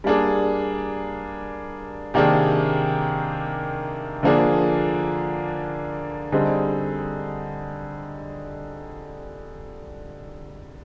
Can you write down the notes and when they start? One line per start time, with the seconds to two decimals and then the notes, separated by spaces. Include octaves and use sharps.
0.04 G3 A#3 D4 G#4
2.14 C3 D#3 A#3 D4 G#4
4.23 D3 F3 A#3 D4 G#4
6.32 D3 G3 C4 D#4 G#4